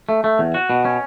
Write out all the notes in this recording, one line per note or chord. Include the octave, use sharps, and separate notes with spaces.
A3
A3
E2
F#4
B2
C#4